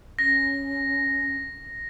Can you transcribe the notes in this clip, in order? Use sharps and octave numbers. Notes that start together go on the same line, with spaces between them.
C#4 A#6